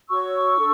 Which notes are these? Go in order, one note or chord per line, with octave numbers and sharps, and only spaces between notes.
F#4 C#5 C#6 E6
D4 A4